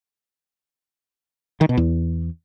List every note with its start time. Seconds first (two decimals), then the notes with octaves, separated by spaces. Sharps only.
1.61 D#3
1.69 B2
1.77 E2